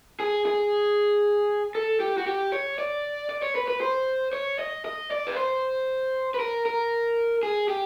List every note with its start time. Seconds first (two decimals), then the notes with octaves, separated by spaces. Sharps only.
0.20 G#4
0.46 G#4
1.75 A4
2.00 G4
2.18 F#4
2.27 G4
2.52 C#5
2.79 D5
3.30 D5
3.43 C#5
3.55 B4
3.68 B4
3.81 C5
4.33 C#5
4.59 D#5
4.85 D#5
5.11 D5
5.27 B4
5.36 C5
6.34 B4
6.40 A#4
6.66 A#4
7.43 G#4
7.69 G4